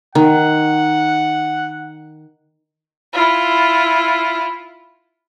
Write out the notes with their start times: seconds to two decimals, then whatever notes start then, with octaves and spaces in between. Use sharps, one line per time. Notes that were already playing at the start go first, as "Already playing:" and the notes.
0.15 D#3 F#5
3.13 E4 F4